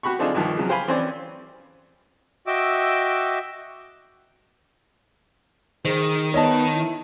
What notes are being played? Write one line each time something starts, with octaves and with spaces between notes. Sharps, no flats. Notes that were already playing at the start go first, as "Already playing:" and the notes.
F#4 G4 B5 C#6
D3 C4 D4 D#4 F4 G#4
C2 G2 D#3 F3
C#3 F3 F#3
G4 C5 F5 G5 G#5 B5
E3 C4 C#4 C5 D5
F#4 D#5 E5 G5 D6 E6
D#3 G#4 C5
B3 C#5 D#5 A5
E4